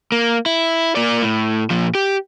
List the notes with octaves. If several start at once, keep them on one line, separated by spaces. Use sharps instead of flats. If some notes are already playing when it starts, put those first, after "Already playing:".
A#3
E4
A#3 D5
A2
A#2 F3
G4